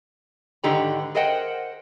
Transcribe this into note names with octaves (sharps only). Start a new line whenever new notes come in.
G#2 D3 D#3 G4 B4 A#5
G#4 A#4 C5 D#5 F#5 G5